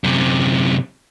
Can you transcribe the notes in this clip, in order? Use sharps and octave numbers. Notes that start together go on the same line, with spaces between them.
F#2 C3